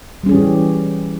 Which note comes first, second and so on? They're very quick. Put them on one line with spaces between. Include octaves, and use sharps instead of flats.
G3 C#4 G#4 E3 G4